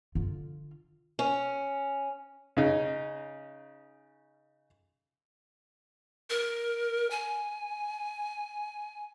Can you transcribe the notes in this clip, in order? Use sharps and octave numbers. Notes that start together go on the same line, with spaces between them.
D3 F4
C#4
C#3 D#4
A#4
G#5